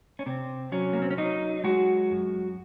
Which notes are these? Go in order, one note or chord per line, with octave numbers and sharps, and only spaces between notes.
C#4
C3 C4
F#3 C#4
A#3
C4
C#4
F#3 D#4
G#3 F#4
F#2